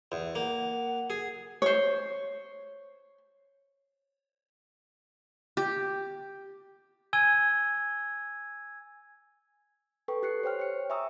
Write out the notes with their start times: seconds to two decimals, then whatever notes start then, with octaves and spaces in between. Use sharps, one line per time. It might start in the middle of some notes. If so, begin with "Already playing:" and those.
0.12 E2
0.35 A#3 F#5
1.10 G#4
1.62 C5 C#5
5.57 G4
7.13 G#5 E6 G#6 D#7 G7
10.08 A4 B4 G5 C#6
10.23 G4 F#6 C7 C#7
10.43 C5 C#5 G5 F6
10.59 C#5 C#7
10.90 E5 G#5 A#5 C#6 D#6 E6